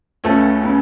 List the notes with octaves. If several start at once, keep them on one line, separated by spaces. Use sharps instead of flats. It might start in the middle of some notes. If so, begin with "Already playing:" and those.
C#2 A3 C#4
C#3